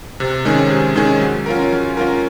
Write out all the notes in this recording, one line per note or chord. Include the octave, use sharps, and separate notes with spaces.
C3
D#3 G#3 C#4 G#4
C3
D#3 G#3 C#4 G#4
F#3
C#4 F4 A#4
F#3
C#4 F4 A#4